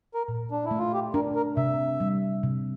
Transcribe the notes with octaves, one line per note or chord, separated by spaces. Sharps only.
A#4
A#2
D4
E4
A3
F4
G4
D4 A#4
A#4
C3 E5
G3
C3